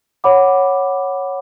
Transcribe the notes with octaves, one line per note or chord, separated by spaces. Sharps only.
C#5 F#5 B5 D6